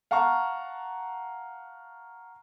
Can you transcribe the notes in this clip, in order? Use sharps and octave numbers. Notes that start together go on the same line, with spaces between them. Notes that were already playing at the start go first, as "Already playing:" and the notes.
F5 F#5 A5 A#5 C#6 F6